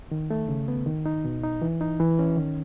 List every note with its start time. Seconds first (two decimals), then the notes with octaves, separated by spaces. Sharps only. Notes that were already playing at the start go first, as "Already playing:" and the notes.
0.11 D#3
0.31 A3
0.48 C#3
0.68 B3
0.86 D#3
1.06 D#4
1.25 B2
1.43 D#4
1.62 E3
1.81 D#4
2.00 E3
2.19 C#4
2.37 D#3